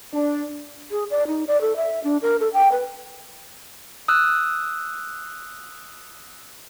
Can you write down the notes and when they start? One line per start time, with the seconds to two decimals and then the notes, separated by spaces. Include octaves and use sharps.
0.13 D4
0.91 G#4
1.10 D5
1.27 D#4
1.47 D5
1.61 A4
1.77 E5
2.04 D4
2.22 A#4
2.40 A4
2.54 G5
2.72 B4
4.08 D#6 E6 F#6